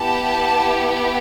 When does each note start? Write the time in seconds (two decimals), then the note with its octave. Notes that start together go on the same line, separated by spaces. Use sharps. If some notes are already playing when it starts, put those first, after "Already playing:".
Already playing: B3 E4 G4 A5